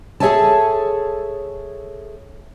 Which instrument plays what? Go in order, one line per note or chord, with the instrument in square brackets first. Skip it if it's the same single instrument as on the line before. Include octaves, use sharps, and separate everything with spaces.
[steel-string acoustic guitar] G#4 A4 C#5 E5 G#5 A5